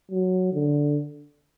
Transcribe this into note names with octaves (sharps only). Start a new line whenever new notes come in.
F#3
D3